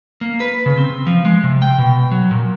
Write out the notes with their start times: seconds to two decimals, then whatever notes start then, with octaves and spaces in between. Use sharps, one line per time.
0.21 A#3
0.40 B4
0.66 C#3
0.77 C4
1.07 F3
1.25 G#3
1.44 C3
1.62 G5
1.78 B2
2.11 F#3
2.31 A#2